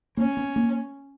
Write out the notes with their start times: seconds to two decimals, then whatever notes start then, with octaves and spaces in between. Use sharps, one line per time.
0.17 A#3 C#4
0.37 B3
0.56 A#3